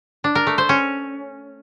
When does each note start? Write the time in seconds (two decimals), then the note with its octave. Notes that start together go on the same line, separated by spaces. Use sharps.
0.24 D4
0.35 A#4
0.47 A3
0.58 C5
0.69 C#4